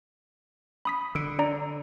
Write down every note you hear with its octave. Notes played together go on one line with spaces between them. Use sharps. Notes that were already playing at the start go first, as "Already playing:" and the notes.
B5 D#6 B6
D3 E6 D7
D4 D5 A#5